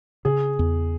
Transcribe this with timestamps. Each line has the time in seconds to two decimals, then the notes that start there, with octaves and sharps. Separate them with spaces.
0.25 C#3 G#4
0.59 E2